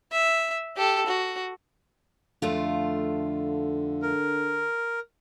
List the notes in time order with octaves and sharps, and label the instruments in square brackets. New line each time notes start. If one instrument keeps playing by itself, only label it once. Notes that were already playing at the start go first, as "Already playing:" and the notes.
[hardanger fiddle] E5
G4 A4
F#4
[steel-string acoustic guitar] F2 A3 F4 [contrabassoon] D3
[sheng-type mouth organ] A#4